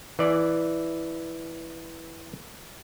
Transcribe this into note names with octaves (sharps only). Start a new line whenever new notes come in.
E3 D5